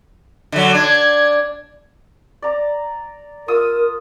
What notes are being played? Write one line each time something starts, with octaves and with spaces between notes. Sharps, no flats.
D3 F#3
D4 G#6
D5 A#5
F4 A#4 D#6 E6